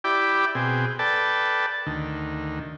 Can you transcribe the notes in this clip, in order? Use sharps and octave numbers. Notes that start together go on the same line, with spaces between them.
E4 G4 D5 G5 B5 D6
B2 C4 G#4 G5
A4 B4 D5 G5 A5
D2 D#3